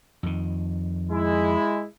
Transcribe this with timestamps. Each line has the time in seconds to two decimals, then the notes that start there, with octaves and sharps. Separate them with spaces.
0.23 F2 D#3
1.11 G#3 E4